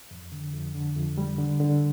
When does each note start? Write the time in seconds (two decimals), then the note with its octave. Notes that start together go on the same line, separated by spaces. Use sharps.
0.11 F2
0.32 D3
0.53 F2
0.75 D3
0.96 F2
1.18 G3
1.38 D3
1.60 D3